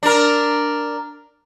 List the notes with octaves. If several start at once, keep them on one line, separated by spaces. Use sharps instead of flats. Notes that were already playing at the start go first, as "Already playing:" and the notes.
D4 A#4